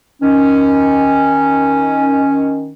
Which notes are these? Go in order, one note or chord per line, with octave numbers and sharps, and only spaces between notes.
D#3 C#4